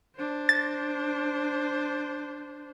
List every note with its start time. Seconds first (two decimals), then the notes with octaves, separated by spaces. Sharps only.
0.16 D4 C5
0.49 A6